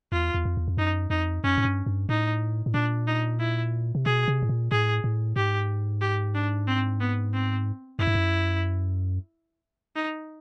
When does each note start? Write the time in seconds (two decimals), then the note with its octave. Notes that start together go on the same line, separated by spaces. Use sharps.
0.12 E2 F4
0.34 E2
0.45 F2
0.57 E2
0.68 F2
0.77 F#2 D#4
1.10 F2 D#4
1.44 F#2 C#4
1.57 G#2
1.65 G2
1.86 G2
2.09 A2 D#4
2.66 A2
2.74 A#2 D4
3.07 D#4
3.40 E4
3.95 C3
4.05 B2 G#4
4.28 C3
4.43 A2
4.49 A#2
4.72 A2 G#4
5.04 A2
5.36 G#2 G4
6.02 G4
6.35 D4
6.67 C4
7.00 B3
7.34 C4
7.99 F#2 E4
8.07 G2
8.15 F#2
9.96 D#4